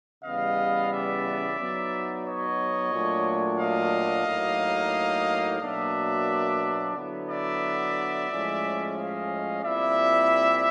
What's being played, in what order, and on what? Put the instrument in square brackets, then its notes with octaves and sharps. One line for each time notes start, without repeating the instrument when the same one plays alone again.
[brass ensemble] C#3 E3 G3 B3 D#5 F5
D5 E5
F#3 B3 D#4
C#5 D#5
A#2 F#3 A3 D4
D#5 F5
A2 F#3 A#3 D#4
B2 F#3 A#3 D4 D5 E5
D3 F#3 B3 E4
D5 E5
A2 F3 G#3 C#4
D#5 F5
A#2 G3 C4 E4 D5 E5